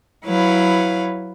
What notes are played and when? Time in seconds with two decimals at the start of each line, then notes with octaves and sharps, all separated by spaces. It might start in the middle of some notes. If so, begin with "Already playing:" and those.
0.25 F#3 E4 B4 C#5 F5